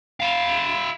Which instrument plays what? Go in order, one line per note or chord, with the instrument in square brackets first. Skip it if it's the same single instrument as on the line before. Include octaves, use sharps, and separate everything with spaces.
[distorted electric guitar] E4 F5